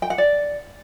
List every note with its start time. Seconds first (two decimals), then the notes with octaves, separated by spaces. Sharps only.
0.02 G5
0.10 F#5
0.18 D5